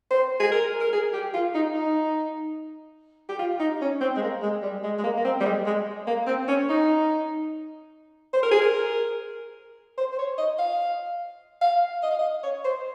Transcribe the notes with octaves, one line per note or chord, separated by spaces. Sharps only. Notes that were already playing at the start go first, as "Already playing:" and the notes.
C5
G#4
A#4
A#4
G#4
G4
F4
D#4
D#4
G4
F4
D#4
C#4
C4
G#3
A#3
G#3
G3
G#3
G#3
A#3
A#3
C4
G3
G#3
G#3
A#3
C4
C#4
D#4
C5
A#4
G#4
A#4
C5
C5
C#5
D#5
F5
F5
D#5
F5
D#5
C#5
C5